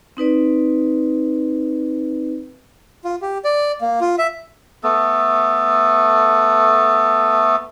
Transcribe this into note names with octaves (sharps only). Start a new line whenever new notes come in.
C4 D#4 B4 D5
F4
G4
D5
A#3
F4
E5
A3 B3 A4